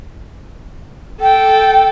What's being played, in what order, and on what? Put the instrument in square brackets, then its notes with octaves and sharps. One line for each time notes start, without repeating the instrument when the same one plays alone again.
[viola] A4 [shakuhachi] G5